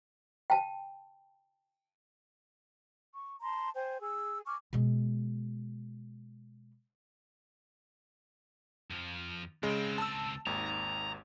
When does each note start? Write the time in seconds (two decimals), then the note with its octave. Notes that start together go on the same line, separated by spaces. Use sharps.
0.50 G5 A5
3.13 C#6
3.41 A5 A#5 C6
3.74 C5 G5 G#5
4.01 G#4 G#5 E6
4.45 G#5 C#6 D6 F6
4.73 B2 G#3
8.90 F2 F3
9.63 C#2 C#3 G#3 C4
9.98 A5 E6
10.46 G#1 D#2 A#5